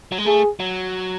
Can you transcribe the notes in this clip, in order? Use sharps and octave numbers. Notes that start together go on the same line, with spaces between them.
F#3
G#3
A3 G#4
F#3